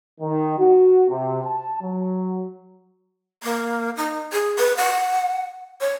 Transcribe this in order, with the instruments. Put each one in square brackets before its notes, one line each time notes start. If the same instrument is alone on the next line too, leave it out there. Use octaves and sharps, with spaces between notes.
[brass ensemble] D#3
F#4
C3
A5
F#3
[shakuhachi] A#3
D#4
G#4
B4
F#5
C#5